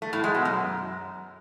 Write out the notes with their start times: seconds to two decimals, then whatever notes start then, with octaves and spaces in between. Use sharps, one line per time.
0.02 A3
0.13 A2
0.24 G#3
0.34 B2
0.45 F#2